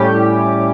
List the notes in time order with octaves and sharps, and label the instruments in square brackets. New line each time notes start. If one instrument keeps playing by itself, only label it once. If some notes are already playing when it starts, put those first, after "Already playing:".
Already playing: [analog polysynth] A2 G3 C#4 G4